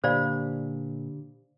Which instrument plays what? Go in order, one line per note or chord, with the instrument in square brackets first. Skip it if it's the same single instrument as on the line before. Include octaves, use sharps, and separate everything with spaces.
[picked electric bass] A#2 [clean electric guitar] D3 G4 B5 [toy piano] C5 D5 F5